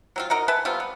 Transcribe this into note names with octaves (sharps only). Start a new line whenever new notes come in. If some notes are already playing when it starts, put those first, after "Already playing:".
F#3 C4 F4
D#4 F#4 A#4 D#5
B4 E5 G#5 A5
G3 B3 C4 F4
B3